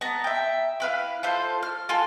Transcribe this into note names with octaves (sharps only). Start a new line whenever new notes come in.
B3 A5 A#5
E5 G5
E4 B4 F5
F4 A4 C5
F6
F4 A4 G#5